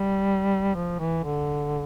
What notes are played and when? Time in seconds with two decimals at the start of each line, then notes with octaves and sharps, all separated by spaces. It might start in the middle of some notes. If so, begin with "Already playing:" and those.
Already playing: G3
0.75 F3
0.99 E3
1.24 D3